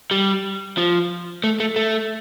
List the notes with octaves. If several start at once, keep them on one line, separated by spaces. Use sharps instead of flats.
G3
F3
A3
A3
A3